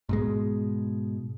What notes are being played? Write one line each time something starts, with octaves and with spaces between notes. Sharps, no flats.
G#2 B2 G#3